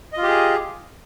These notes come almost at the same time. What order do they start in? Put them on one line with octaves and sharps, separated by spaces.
D#5 F4 G4 G#4